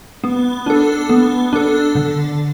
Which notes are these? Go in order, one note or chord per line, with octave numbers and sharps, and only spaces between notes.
B3
D4 A4
B3
D4 A4
D3